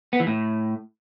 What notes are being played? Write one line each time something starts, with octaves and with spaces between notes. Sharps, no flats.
B3
E3
A2